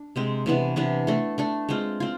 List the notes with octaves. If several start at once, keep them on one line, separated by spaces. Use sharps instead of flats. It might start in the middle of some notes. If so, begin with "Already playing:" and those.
Already playing: D4
C3 G#3 C4
C3 E3 B3 D4
C3 E3 B3 D4
A3 D4 A4
A3 D4 A4
G#3 C4 F4
C4 F4